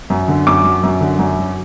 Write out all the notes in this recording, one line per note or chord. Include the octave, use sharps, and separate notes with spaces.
F#2
D3
F#2 D6
F#3
F#2
D3
F#2
F#3